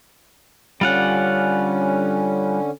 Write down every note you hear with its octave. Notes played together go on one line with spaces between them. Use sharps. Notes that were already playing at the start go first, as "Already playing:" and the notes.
D3 G3 C#4 F4 F#5